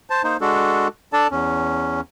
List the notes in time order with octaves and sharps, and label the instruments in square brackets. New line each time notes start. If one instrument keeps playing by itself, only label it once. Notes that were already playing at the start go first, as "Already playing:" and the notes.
[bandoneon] C5 A5
A#3 D#4 C5
G#3 D4 F#4 A4
D4 A4 D5 A5
E2 C#4